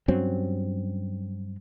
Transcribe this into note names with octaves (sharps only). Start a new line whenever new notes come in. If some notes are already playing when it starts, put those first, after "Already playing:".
G2 F#3 C4 C#4